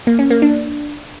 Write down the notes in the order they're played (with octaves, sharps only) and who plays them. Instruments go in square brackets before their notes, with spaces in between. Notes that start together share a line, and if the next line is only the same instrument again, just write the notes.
[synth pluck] A#3
C#4
A#3
D4